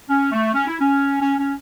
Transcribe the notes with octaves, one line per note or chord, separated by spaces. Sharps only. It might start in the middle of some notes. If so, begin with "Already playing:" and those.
C#4
A3
C#4
E4
C#4
C#4
C#4